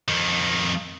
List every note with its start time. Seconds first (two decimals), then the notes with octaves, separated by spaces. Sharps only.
0.08 F2 D#3